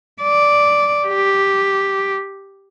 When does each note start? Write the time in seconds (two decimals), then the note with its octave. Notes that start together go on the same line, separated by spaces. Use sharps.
0.22 D5
1.08 G4